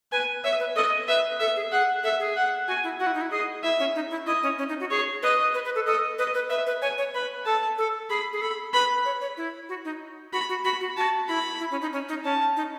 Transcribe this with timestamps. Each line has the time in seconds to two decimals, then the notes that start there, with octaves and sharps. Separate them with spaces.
0.12 B4 G#5
0.44 C#5 E5
0.59 B4
0.76 A4 D#5
1.08 B4 E5
1.40 A4 E5
1.56 G#4
1.72 G#4 F#5
2.03 A4 E5
2.19 G#4
2.36 F#5
2.68 F#4 G#5
2.84 E4
2.99 F#4 F#5
3.07 E4
3.14 D#4
3.21 E4
3.31 G#4 D#5
3.63 E4 E5
3.79 C#4
3.95 D#4
4.10 E4
4.26 E4 D#5
4.43 C#4
4.59 C#4
4.69 D#4
4.80 F#4
4.90 G#4 C#5
5.23 B4 D#5
5.54 B4
5.65 B4
5.75 A4
5.86 A4 D#5
6.19 B4 D#5
6.34 B4
6.50 B4 E5
6.66 B4
6.82 C#5 G#5
6.98 C#5
7.14 B4 B5
7.45 A4 A5
7.78 A4
8.10 G#4 B5
8.33 G#4
8.41 A4 B5
8.73 B4 B5
9.05 C#5
9.21 C#5
9.37 E4
9.69 F#4
9.85 D#4
10.33 F#4 B5
10.49 F#4
10.64 F#4 B5
10.80 F#4
10.97 F#4 A5
11.28 E4 B5
11.60 E4
11.71 C#4
11.82 D#4
11.93 C#4
12.09 D#4
12.24 C#4 A5
12.57 D#4